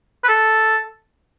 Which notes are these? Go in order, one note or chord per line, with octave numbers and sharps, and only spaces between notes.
B4
A4